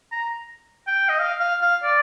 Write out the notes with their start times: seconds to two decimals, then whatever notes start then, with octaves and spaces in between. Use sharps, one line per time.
0.12 A#5
0.87 G5
1.09 D#5
1.19 F5
1.40 F5
1.62 F5
1.84 D5